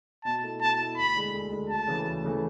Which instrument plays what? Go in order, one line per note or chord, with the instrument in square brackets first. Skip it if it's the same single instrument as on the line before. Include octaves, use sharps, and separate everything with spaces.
[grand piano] B2 [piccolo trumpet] A5
[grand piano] A3 E4
[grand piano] B2 [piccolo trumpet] A5
[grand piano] A3 E4
[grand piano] D2 [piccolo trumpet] B5
[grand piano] D3 G#3
D2
D3 G#3
[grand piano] D2 [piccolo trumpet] A5
[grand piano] C#3 E3 A3
D2
C#3 E3 A3